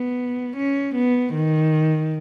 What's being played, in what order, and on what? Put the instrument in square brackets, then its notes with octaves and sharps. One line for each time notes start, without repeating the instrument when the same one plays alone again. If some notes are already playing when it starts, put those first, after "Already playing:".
Already playing: [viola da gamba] B3
C#4
B3
D#3